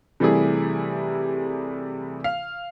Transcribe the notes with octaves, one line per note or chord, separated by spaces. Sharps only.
C3 E3 G3 A3 E4 G#4
F5